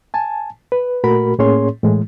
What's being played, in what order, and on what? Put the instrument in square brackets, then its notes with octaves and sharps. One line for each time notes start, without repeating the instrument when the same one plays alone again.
[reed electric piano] G#5 A5
B4
A#2 A3 F#4 A#4 B5
A2 A#3 C#4 G#4 C#5 C6
A2 E3 G#3